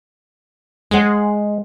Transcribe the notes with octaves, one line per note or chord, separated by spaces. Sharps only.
G#3 G#4 C5 F#5